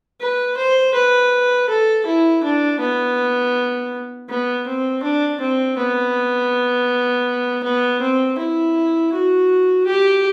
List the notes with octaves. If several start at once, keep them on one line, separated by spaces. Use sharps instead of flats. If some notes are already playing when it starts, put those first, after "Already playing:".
B4
C5
B4
A4
E4
D4
B3
B3
C4
D4
C4
B3
B3
C4
E4
F#4
G4